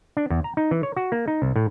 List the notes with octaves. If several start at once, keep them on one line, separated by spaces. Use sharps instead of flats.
D4
E2
A#5
D#4
E3
C#5
F#4
A#3
D#4
C2
A2